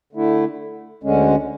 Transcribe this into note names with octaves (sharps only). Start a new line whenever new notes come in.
D3 A3 E4
D2 D3 G#3 C#4